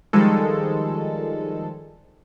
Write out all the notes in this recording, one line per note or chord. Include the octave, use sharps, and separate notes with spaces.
D#3 F3 G3 G#3 A4